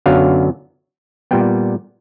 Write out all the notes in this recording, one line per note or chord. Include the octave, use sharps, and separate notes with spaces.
F#2 D3 F#3 B3 F5
A#2 G3 B3 G5